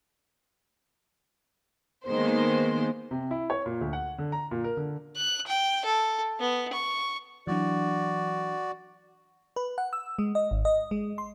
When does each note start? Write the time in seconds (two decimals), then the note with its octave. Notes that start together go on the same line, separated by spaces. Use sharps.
2.07 D#3 G#3 A#3 B3 C5
3.11 C3
3.31 E4
3.50 C#5
3.66 A#2
3.81 D2
3.93 F#5
4.18 D3
4.32 A#5
4.51 A#2
4.64 A#4
4.77 D3
5.16 F#6
5.47 G5
5.85 A4
6.40 B3
6.73 C#6
7.47 E3 F#3 D4 F#4 D5
9.56 B4
9.78 F#5
9.93 E6
10.18 G#3
10.35 D#5
10.51 G#1
10.65 D#5
10.91 G#3
11.18 C6